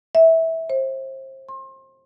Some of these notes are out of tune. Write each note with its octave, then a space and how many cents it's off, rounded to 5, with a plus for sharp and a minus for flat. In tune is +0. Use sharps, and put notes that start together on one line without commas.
E5 -20
C5 +30
C6 +35